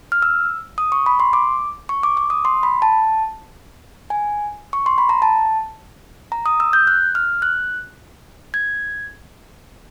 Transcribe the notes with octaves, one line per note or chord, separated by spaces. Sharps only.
F6
E6
D#6
C#6
B5
C6
D6
C#6
D6
D6
D#6
C6
B5
A5
G#5
C#6
C6
B5
A#5
A5
A#5
D#6
E6
G6
F#6
F6
F#6
G#6